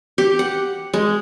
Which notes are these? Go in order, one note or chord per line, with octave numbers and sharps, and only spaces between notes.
G4
F#5
G#3